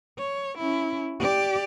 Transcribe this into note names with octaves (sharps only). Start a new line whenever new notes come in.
C#5
C#4 E4
G4 D5